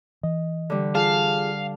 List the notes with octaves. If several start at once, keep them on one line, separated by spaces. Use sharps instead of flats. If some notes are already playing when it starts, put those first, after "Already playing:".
E3 D#5
D3 G3
F4 G#4 F5 A5